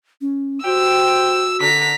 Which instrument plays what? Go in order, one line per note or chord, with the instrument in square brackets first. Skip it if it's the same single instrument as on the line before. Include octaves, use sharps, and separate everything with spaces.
[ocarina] C#4
[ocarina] F#4 [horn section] G4 C5 G5 [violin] E6
[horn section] D3 [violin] A#5 B6